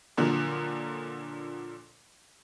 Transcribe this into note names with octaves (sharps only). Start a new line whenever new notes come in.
A#2 D3 F3 F#3